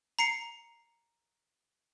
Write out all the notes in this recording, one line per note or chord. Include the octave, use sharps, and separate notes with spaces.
A#5 C7 C#7